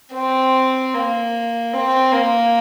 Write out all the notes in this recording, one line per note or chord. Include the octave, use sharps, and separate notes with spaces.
C4
A#3
C4
A#3